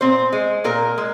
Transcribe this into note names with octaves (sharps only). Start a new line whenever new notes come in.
A#2 C4 C5
G#3
A#2 A#3 A#4
G#3